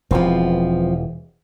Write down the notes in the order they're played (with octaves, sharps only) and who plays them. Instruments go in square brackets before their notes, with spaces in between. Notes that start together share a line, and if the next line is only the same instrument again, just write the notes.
[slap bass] E1 E3 [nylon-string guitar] F3 B3 C4